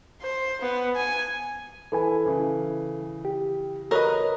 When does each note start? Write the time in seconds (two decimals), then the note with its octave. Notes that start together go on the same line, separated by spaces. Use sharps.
0.22 C5
0.61 B3
0.96 G#5
1.92 E3 E4 A4 B4 G#5
2.26 C#3 E3
3.25 G4
3.91 F#4 A#4 B4 C#5 D#5